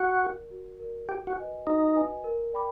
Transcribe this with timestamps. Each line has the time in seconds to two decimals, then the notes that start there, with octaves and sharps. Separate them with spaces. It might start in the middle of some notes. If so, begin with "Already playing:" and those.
Already playing: F#4
0.22 A#4 D5
0.51 F#4
0.79 A#4 D5
1.08 F#4 G4
1.27 F#4
1.37 B4 D#5 G#5
1.66 D#4 F#4
1.95 B4 D#5 G#5
2.24 A#4
2.53 D5 G5 B5 D6